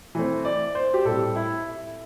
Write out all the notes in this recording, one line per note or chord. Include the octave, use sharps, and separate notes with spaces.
E3 A3 C4
D5
C5
G4
A2 G3 C4 A4
E4